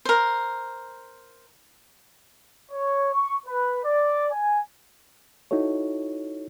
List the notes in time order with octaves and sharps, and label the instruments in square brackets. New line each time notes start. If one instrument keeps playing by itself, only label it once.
[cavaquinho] A#4 C5
[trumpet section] C#5
C#6
B4
D5
G#5
[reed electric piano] D#4 E4 F#4 A4 C#5